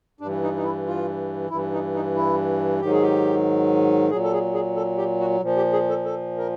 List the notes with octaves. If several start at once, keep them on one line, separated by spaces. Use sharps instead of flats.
G2 D4
E3
D#4
D#4
E4
F4
G2 E3 E4
D#4
D#4
E4
G#2 D#3 F#3 G4
G#4
G4
A#2 F#3 G#4
A4
G#4
G#4
A4
G4
F#4
A#2 F3
G4
G#4
A4
A4
A#4